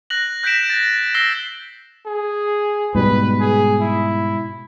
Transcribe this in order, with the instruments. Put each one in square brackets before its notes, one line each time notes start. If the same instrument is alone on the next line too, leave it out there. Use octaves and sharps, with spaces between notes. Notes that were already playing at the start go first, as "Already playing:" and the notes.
[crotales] F#6 A#6 F#7
F#6 G6 A#6 B6 D7 E7
A6
E6 A#6 C7 G7
[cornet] G#4
[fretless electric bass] G#2 B2 G3 [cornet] B4
[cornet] G#4
E4